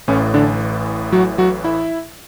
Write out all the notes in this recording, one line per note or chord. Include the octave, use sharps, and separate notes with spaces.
A1 A2 E3 C#4
D3 D4
F#3 F#4
F#3 F#4
E4 E5